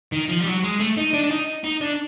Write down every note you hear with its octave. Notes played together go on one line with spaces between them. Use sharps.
D#3
F3
G3
F#3
G#3
A3
D#4
D4
D4
D#4
D#4
D4